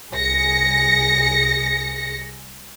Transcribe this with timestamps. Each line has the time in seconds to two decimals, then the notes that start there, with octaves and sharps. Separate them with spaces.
0.13 C2 G#4 A#6 C#7